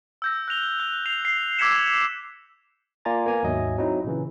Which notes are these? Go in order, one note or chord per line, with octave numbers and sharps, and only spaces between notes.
E6 G6 A#6
F#6 A#6 F7 G7
F#6
F#6 C7 F7
C7
D6 E6 G#6 B6 C#7 E7
A#3 F4 D5 G#5 A#5 A6
A#3 B3 G#5 A#5
D#2 G#2 F#3 D#5 E5 G#5
F#3 C4 D#4 E4
A#2 C#3 E3